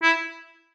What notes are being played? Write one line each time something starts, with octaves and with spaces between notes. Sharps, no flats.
E4